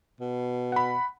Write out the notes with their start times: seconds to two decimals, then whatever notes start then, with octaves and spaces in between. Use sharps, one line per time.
0.21 B2
0.72 F#5 B5